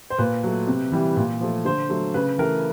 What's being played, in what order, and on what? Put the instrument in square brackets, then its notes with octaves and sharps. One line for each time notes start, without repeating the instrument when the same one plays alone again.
[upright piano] C5
A#2 B4
F#3 A3
C3
E3 G3
A#2
F3 A3
D3 C5
F#3 A3
C#3 B4
E3 A3 A#4